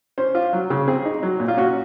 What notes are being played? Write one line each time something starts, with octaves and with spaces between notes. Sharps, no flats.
C#4 C5
F4
F#3
C#3
C4 G#4
D#4
F#3
A#2
F4
C#4 F#4